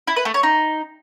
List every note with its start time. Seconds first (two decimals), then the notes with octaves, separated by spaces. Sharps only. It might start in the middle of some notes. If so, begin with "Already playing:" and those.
0.07 E4
0.16 B4
0.25 A3
0.34 C#5
0.43 D#4